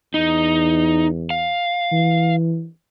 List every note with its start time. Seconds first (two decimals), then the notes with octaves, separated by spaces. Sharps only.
0.14 E2 D#4
1.30 F5
1.92 E3